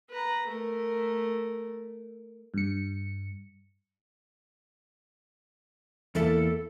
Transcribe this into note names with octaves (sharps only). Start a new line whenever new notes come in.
B4 A#5
A3 A#4
G2 C#7
E2 A#3 E4 A4